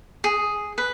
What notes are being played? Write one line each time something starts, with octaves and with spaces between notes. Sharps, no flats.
G#4
B4